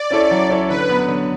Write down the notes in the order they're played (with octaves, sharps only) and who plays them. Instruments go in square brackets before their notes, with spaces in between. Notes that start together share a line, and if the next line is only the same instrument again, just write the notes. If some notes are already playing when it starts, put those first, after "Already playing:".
Already playing: [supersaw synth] D5
[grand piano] C#4 E4 A4 C#5
F#3
C#4 E4 A4 C#5
[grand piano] D3 [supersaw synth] B4
[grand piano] F#3 B3
D3